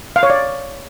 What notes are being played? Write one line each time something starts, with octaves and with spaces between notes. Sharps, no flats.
F5
C#5
D5